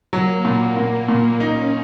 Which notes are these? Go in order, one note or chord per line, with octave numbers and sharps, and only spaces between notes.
F#3 A#3
A#2
A#2
A#2
C#4 D#4